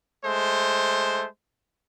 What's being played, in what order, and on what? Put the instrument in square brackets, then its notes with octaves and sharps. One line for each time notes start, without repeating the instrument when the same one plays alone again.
[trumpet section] G#3 A3 C5